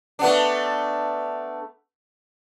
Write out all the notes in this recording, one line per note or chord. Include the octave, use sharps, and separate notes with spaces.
A3 B3 D4